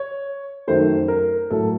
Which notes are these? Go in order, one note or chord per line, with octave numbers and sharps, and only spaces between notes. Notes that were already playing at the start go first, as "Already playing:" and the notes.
Already playing: C#5
F#2 D#3 A3 C5
A#4
A2 F#3 A3 A4